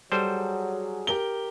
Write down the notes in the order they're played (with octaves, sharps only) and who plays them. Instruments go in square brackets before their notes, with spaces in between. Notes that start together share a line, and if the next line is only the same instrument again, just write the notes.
[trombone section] F#3 G#4 [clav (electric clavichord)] G3 A4 C5
[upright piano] G4 A#4 G7